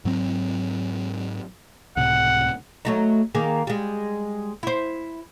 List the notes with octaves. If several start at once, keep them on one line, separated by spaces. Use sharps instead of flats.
G#2 F#3 C4
C#2 A2 C3 F#5
F#3 A3 D#4
D#3 A#3 G#4
G3 G#3
E4 C5